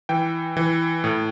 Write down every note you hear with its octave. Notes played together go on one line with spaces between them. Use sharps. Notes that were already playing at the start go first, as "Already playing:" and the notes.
E3 G5
E3
A2